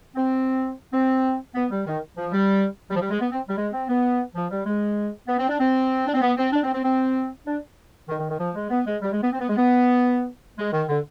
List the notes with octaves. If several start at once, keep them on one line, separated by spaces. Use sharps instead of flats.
C4
C4
B3
G3
D#3
F3
G3
G3
F3
G3
G#3
B3
C4
G3
G#3
C4
B3
F3
G3
G#3
B3
C4
D4
C4
D4
C4
B3
C4
D4
C4
C4
C4
D4
D#3
D#3
D#3
F3
G#3
B3
G#3
G3
G#3
B3
C4
B3
G#3
B3
G#3
D#3
D3